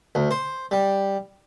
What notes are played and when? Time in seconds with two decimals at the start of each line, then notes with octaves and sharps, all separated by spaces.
0.15 D2
0.31 C5
0.71 G3